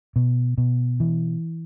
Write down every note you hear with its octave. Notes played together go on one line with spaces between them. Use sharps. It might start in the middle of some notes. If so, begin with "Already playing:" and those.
B2
B2
E3